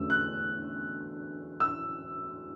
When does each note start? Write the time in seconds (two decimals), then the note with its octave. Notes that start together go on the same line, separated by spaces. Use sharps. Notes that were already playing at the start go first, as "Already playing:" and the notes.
Already playing: E2 D3 F#3 A3 C#4 E6
0.10 F#6
1.60 E6